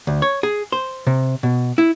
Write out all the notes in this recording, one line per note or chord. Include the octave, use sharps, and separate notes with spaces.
D2
C#5
G#4
C5
C3
B2
E4